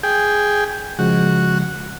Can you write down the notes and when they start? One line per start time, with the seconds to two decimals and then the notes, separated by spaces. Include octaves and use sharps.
0.03 G#4 G5
0.99 C#3 F3 G#3 F#4